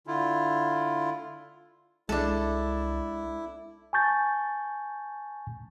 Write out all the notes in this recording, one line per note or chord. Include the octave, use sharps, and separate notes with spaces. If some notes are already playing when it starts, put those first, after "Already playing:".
D3 E4 F4
C2 G#3 D4 E4 A4
G#5 A5 C#6 G6 A6